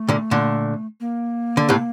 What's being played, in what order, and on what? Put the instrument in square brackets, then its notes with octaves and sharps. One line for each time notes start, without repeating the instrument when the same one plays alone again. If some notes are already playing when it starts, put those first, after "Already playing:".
Already playing: [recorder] A3
[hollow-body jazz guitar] A#2 D3
A#2 D3
[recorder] A#3
[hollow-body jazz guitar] D3
A2 C3